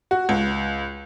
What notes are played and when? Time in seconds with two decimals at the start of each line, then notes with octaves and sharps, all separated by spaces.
0.11 F#4
0.29 C#2